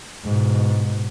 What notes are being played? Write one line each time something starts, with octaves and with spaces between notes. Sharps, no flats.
G#2 B2